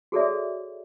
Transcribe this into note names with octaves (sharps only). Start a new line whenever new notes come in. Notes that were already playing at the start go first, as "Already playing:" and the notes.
F#4 G#4 A4 C#5 D5 E5